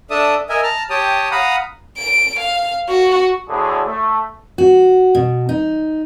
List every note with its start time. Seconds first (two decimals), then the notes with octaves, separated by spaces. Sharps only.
0.10 D4 A4 D5 E5 A5 D#6
0.49 A#4 D#5 E5 G#5
0.63 A5 A#5 F6
0.90 G4 C#5 G5 A5 D#6
1.31 F5 F#5 A#5 B5 D#6
1.98 D7
2.39 F5
2.89 F#4
3.48 D2 A2 D3 G#4
3.85 A3
4.58 F#4
5.15 B2
5.49 D#4